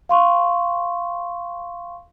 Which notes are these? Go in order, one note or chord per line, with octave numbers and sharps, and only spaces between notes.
F5 C6 C#6